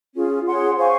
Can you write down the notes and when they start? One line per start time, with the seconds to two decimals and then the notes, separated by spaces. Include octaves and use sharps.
0.14 C#4 F4 G#4
0.45 G#4 C#5 F#5 C6
0.76 C5 F5 G#5 C#6